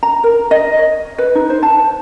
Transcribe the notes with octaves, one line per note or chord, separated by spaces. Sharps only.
A#5
A#4
D#5
C#5
B4
D#4
C5
A5